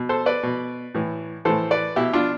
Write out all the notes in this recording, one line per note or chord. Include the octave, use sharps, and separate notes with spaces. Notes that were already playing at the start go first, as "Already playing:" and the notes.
Already playing: B2
A4 C5
B4 D5
B2
A2 E3
A2 E3 A4 C5
B4 D5
B2 E4 G4
D4 F4